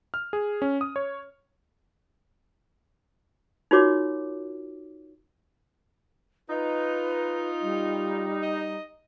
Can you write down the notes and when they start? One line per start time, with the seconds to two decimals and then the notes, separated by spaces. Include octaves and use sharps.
0.14 F6
0.33 G#4
0.62 C#4
0.81 D#6
0.96 C#5
3.71 D#4 F4 F#4 A#4 C#5 D6
6.49 D#4 F4 B4
7.62 G3
8.43 D#5